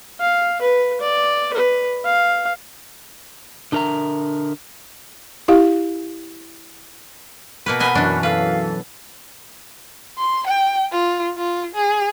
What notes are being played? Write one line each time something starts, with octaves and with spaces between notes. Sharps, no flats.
F5
B4
D5
B4
F5
D3 D4 A#4 E5 A#5
E4 G4 F5
B2 A#3 B4
D#5 F#5 G#5 B5
F#2 E3 D4
A4 B4 F5
C6
G5
F4
F4
G#4